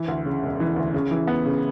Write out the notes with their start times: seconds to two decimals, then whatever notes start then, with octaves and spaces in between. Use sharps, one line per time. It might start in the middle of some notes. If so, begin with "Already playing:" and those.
Already playing: E3
0.08 D2
0.26 C#3
0.43 E1
0.60 E3
0.76 D2
0.94 C#3
1.11 E3
1.27 B3
1.46 C#3